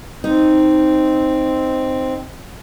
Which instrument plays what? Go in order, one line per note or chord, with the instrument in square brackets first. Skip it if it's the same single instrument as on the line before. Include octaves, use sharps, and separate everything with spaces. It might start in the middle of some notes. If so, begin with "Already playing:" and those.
[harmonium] C4 [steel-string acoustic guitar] D#4